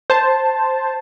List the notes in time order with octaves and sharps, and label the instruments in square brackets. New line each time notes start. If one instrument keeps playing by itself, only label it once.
[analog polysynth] C5 A5